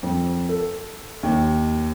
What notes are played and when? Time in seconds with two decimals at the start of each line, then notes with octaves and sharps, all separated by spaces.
0.03 F2
0.49 A4
1.23 D#2